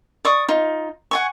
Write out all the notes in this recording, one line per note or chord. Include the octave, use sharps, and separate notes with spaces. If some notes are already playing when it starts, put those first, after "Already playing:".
D5 C#6 D#6
D#4 F4
F#5 G#5 C#6